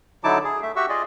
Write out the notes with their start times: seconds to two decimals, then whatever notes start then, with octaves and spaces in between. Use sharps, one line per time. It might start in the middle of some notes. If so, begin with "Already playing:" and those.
0.24 D3 F#3 D#4 E4 A5 D6
0.44 G#4
0.62 A3 E5
0.76 F#4 G4 E5 F#5 C#6 E6
0.89 F4 G#4 D5 D#5